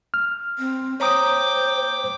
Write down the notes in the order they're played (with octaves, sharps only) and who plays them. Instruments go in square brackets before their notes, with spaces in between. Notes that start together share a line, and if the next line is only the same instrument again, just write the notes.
[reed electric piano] F6
[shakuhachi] C4
[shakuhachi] C5 [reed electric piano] C#5 A#5 D#6 [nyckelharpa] G5 D6